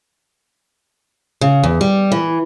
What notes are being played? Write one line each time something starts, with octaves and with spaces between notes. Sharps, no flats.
C#3
E2
G3
E3